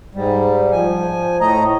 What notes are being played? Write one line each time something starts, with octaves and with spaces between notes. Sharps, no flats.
G#2 G3
F3 G#5
A2 A3 D#5 A#5